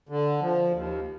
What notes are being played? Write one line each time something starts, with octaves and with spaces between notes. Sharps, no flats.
D3
F3
D#2